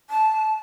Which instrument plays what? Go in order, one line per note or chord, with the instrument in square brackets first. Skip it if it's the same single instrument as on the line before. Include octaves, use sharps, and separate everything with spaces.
[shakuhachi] A5